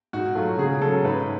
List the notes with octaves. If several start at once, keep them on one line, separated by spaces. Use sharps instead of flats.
G#2 F#4
F#3 A3 F4
C#3 G#4
F#3 C#4 A4
G#2 B4